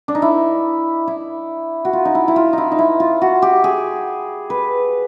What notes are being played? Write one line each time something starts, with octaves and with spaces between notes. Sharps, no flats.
D4
D#4
E4
E4
F#4
F4
D#4
E4
E4
F4
D#4 E4
D#4
E4
F4
F#4
G4
G#4
B4